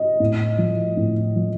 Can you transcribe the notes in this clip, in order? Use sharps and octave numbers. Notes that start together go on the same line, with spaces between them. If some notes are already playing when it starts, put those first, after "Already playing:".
Already playing: D#5
A2
F3
A2
F3